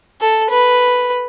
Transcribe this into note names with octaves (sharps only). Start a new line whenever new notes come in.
A4
B4